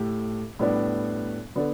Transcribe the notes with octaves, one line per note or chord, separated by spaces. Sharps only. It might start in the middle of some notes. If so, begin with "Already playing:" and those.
Already playing: A2 A3 G4
A2 G3 B3 D4
D3 B3 D4 A4